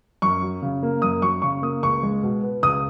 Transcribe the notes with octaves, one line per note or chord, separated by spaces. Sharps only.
F#2 C#6
F#3
C#3
A#3
F#2 D#6
F#3 C#6
C#3 C#6
A#3 D#6
C#2 C#6
G#3
B2
B3
C#2 D#6